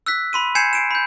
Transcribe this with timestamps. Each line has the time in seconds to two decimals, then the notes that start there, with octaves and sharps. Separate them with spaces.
0.07 E6 F#6 B6
0.33 B5 C6 D#7
0.55 G#5 G6 G#6 C7 C#7 E7
0.73 C7 D7 E7
0.91 B5 G6